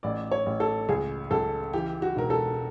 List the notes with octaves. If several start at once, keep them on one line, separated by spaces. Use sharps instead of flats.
A1 D5
C#5
A1
A4
C#2 G#4
C#2 A4
E3 G4
F#4
E1 A#4
A4